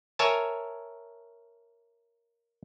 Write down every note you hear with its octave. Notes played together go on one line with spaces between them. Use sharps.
A#4 C#5 E5 G#5 A5